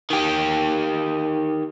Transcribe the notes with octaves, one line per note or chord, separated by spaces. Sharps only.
D#3 G4